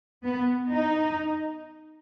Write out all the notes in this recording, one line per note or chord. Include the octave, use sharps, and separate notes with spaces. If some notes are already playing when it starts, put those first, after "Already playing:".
B3
D#4